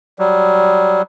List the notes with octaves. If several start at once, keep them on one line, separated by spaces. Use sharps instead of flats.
F#3 G3